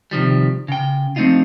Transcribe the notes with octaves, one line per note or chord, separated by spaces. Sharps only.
C3 D#3 F3 G3
C#3 G5
F3 A3 C4 D4 D#4 F4